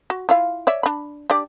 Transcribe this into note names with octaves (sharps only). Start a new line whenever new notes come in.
F#4
E4 F4 F5
C#5 D5 E5
D4 B5
D4 G4 D5